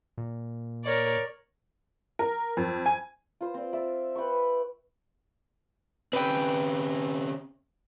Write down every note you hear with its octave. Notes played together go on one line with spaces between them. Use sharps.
A#2
A#4 C#5 D5
A#4
F2
G#5
F4 C5 D#6
C4 D5
D5 E5
B4 G5 B5 C#6
C#3 C4 B4 G5